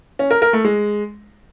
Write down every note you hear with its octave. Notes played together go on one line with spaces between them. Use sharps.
C#4
A#4
A#4
A3
G#3